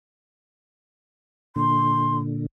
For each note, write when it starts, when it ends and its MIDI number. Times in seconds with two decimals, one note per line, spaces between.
1.56 2.46 46
1.56 2.46 50
1.56 2.17 84